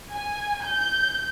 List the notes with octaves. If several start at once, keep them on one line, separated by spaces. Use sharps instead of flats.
G#5
G6